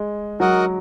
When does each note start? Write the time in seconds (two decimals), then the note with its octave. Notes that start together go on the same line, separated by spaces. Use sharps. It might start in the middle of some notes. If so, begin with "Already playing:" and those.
Already playing: G#3
0.40 F#3 F#4 A#4 D#5 F#5